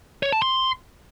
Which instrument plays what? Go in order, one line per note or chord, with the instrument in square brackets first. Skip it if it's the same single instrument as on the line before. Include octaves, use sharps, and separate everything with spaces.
[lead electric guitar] C#5
A5
C6